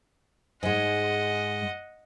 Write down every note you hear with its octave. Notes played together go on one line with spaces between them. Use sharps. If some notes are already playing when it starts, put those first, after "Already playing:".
G#2 G#3 D#5 F#5